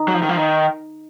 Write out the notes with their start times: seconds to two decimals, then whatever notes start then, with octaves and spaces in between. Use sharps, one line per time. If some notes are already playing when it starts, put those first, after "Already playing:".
Already playing: D#4
0.08 F#3
0.14 F3
0.22 D#3
0.29 F3
0.37 D#3